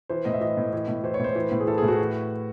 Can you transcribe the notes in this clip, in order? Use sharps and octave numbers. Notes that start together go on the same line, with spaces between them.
E3 C5
A2 D#5
E5
E3 D#5
A2
E3
A2
E3 C5
C#5
A2 C5
E3
A2
G#4
E3 A4
A2 G#4
F#4
E3